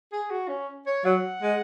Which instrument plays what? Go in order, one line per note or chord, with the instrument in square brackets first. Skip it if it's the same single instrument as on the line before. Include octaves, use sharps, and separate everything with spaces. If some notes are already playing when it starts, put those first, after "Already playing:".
[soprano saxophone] G#4
F#4
C#4
C#5
[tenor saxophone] F#3 [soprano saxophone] F#5
[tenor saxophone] G#3